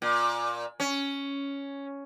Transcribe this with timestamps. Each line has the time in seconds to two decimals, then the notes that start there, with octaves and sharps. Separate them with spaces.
0.02 A#2
0.80 C#4